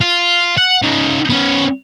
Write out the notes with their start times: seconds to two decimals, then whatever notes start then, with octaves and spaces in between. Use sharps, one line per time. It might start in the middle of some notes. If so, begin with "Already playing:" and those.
0.01 F4
0.58 F#5
0.82 C#3 D#4
1.30 B3 C#4